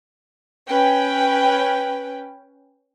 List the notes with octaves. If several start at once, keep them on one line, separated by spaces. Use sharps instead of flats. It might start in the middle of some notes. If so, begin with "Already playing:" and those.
C#4 B4 G5